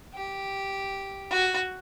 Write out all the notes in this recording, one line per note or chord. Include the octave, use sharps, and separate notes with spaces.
G4
F#4